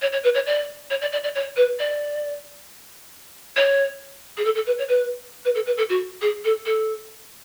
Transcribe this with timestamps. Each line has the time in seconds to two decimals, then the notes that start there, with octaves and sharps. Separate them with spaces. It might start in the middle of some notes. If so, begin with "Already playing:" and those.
0.02 C#5
0.12 C#5
0.24 B4
0.35 C#5
0.47 D5
0.90 C#5
1.01 D5
1.12 D5
1.24 D5
1.35 C#5
1.57 B4
1.79 D5
3.56 C#5
4.37 G#4
4.45 A4
4.55 A4
4.66 B4
4.79 C#5
4.89 B4
5.45 B4
5.55 A4
5.66 B4
5.77 A4
5.89 F#4
6.21 G#4
6.45 A4
6.66 A4